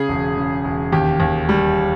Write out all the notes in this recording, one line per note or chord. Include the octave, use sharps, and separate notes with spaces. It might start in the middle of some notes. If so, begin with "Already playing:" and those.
Already playing: C#3 G#4
E1
C#3
E1
D#2 G4
D#2
G3